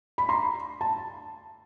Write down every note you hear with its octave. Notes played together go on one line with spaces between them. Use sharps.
B5
A#5 C6
A5